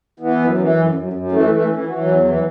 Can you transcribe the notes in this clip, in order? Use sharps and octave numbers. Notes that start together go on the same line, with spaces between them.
E3 B3
F#2
E3
F#2
F#2
F#2
E3 A3
E3 A3
E3 C#4
E4
E3 F#4
F#3
E2
E3
F#3